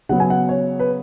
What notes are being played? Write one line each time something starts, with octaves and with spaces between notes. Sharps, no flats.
C#3 F#3 B3 F#5
G#5
F#5
C#5
B4